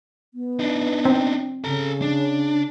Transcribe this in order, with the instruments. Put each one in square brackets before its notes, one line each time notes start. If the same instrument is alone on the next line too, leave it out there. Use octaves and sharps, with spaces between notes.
[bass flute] B3
[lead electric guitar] D4 D#4
[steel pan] C4
[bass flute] C#3 [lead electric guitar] A4 A#5
[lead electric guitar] D4